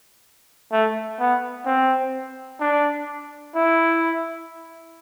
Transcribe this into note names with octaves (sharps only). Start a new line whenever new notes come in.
A3
B3
C4
D4
E4